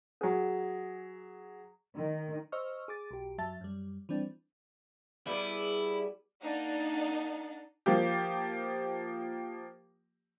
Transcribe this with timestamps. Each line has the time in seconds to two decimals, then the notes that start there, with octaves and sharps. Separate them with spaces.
0.21 F#3 G#4
1.95 D#3
2.52 C5 D#5 C#6 E6 F6
2.88 G#4 D6 A6
3.11 B1 G4
3.38 F#2 F#3 E5 A5 A6
3.61 F#2 G3
4.09 E3 G3 C4 D4
5.27 G3 B3 E4 G#4
6.43 A#3 D4 D#4 F#5 A6
7.86 F3 A#3 G4